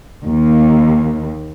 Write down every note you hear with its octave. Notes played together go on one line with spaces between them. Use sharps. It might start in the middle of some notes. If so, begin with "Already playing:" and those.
D#2